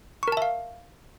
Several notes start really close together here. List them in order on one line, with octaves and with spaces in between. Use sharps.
C#6 A#4 A5 E5 F5